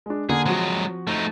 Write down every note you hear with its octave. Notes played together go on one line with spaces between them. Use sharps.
G#3 D4
D3 A#3 G#4
F3 F#3 G#3 C4 F#4
A3 D#4